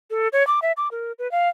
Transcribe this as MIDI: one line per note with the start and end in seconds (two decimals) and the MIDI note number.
0.10 0.28 69
0.33 0.46 73
0.47 0.60 86
0.62 0.72 76
0.77 0.88 86
0.91 1.12 70
1.19 1.30 71
1.31 1.49 77